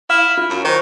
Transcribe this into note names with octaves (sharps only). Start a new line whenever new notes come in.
E4 F5 F6
F4
F#2
D#3 C5 C#6